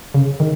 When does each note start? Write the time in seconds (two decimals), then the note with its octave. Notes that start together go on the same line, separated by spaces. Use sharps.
0.14 C#3
0.40 D#3